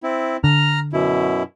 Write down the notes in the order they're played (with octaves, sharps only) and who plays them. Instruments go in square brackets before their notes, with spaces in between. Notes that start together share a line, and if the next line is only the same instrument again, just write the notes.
[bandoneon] C4 E4
[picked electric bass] D3 [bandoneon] A#5 F6
[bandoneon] F#2 B2 E4